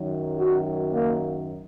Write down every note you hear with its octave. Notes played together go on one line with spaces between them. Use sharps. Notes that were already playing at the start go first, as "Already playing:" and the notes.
Already playing: F#2 D#3 F#3
F#4
A#3